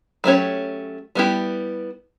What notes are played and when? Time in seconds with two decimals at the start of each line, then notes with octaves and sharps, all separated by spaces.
0.24 F#3 A3 C#4 G4 C#5
1.15 G3 B3 E4 G4